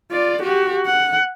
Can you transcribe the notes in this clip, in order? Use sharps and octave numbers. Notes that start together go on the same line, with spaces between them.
F4 D5
F#4 G4
F#5